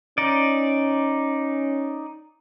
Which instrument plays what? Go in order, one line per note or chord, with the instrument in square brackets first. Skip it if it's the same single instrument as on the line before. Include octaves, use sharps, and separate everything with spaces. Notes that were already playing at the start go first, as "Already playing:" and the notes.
[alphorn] C#4 [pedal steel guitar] D#4 D5